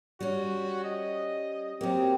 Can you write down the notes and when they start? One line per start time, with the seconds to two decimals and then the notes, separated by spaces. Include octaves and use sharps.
0.20 G3 C#4 F#4
0.85 D#5
1.81 F#3 A#3 C4 G4